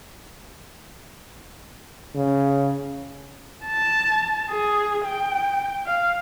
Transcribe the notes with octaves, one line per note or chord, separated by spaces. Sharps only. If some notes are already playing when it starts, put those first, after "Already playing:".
C#3
A5
G#4
G5
F5